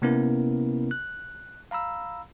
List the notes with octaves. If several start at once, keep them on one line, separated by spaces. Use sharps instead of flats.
C3 A#3 B3 C#4 E4 A#4
F#6
F5 A#5 B5 E6